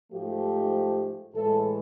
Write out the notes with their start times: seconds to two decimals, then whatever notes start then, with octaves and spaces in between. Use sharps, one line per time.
0.12 G#2 F3 A3 G4
1.34 A2 E3 G#3 A4